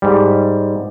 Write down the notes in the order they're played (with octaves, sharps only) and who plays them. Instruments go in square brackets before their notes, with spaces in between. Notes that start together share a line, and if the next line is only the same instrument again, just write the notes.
[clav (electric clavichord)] G#2 G3